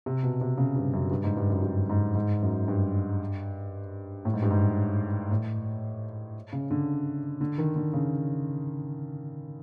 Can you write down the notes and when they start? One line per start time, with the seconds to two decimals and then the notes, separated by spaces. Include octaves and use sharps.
0.06 C3
0.23 B2
0.41 C3
0.58 C#3
0.76 G2
0.93 F#2
1.11 G2
1.24 G#2
1.37 G2
1.50 F#2
1.63 G2
1.89 G#2
2.15 G#2
2.42 F#2
2.68 G2
4.25 A2
4.34 G#2
4.42 G2
4.51 G#2
5.31 A2
6.53 C#3
6.71 D3
7.41 D3
7.58 D#3
7.76 D3
7.94 C#3